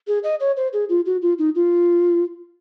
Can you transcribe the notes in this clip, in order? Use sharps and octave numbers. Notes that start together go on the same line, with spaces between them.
G#4
D#5
C#5
C5
G#4
F4
F#4
F4
D#4
F4